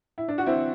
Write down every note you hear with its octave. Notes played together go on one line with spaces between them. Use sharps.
E4
D4
F#4
C4 E4